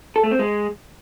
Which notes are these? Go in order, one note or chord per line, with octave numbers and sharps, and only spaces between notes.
A4
A3
C4
G#3